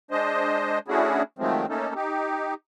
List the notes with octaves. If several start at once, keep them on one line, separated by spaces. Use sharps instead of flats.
G#3 D4 C5 D#5
A3 C#4 D4 E4 F#4 G#4
D#3 F3 F#3 G#3 A3 C4
A3 A#3 C#4 D#4 A4
D#4 G4